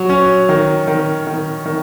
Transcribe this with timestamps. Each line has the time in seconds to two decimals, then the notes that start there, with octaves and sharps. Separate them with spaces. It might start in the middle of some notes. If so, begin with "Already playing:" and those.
Already playing: F#3
0.09 C#4
0.49 D#3
0.88 D#3
1.27 D#3
1.66 D#3